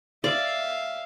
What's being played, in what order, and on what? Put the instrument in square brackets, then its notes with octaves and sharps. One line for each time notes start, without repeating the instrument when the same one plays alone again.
[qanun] D5 [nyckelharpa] E5 F5